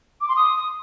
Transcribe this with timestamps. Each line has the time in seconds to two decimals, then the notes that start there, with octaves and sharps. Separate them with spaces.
0.20 D6
0.28 C6
0.36 D#6